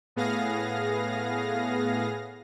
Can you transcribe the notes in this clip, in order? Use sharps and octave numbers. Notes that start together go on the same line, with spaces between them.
A2 B3 G#4 F5 A#6